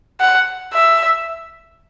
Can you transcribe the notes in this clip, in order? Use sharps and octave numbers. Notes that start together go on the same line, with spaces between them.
F#5
E5